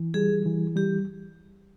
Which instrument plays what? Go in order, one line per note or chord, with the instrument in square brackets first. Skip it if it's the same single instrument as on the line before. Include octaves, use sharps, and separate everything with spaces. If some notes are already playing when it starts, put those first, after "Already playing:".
Already playing: [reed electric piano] E3
[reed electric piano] G3 [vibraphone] G#4
[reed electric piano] E3
[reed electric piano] G3 [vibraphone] G4